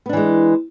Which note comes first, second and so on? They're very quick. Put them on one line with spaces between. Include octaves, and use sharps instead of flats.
B3 D4 E3 G#3